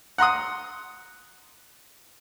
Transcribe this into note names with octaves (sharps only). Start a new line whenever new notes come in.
F#5 A#5 C6 D#6